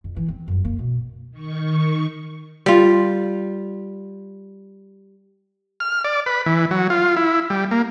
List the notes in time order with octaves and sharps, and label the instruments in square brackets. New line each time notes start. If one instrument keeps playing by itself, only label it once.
[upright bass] F2
E3
C4
G1 F#2
A#3
B2
[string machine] D#3 C#6
[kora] G3 F4
[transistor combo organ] F6
D5
B4
E3
F#3
F4
E4
G3
A#3